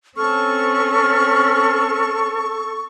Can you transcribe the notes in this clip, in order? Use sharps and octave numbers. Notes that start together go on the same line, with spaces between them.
C4 C#4 A4 C#6 F6